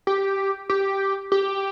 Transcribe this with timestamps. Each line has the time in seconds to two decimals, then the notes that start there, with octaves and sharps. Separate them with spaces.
0.07 G4
0.70 G4
1.32 G4